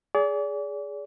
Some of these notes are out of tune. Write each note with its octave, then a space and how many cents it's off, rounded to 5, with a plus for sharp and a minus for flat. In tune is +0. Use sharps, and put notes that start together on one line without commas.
G#4 +0 D5 -35